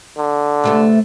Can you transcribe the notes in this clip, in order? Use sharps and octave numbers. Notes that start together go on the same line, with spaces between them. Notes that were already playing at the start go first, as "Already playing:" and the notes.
D3
C3 A3 B3